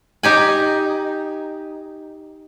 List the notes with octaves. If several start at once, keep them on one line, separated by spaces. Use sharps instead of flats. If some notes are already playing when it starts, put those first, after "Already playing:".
D#4 G4 G#5